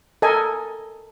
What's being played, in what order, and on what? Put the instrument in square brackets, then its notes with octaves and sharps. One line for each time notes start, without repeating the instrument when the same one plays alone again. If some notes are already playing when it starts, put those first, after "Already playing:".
[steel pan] A4 A#4 D#5 G#5